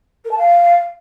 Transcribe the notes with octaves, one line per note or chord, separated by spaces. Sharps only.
A#4
A5
F5